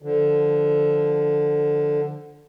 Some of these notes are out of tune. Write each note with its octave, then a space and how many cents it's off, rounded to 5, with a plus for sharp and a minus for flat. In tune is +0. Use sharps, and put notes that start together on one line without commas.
D3 +5 F3 +0